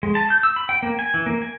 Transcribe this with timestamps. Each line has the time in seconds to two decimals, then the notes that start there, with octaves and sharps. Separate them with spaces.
0.03 G#3
0.15 A5
0.30 G6
0.43 E6
0.56 B5
0.69 G5
0.83 A#3
0.99 G#5
1.14 E3
1.26 A#3
1.42 G#5